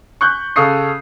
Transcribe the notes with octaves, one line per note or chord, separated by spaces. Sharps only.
C#6 F#6 G6
C#3 A4 F5 C#6 D#6 C7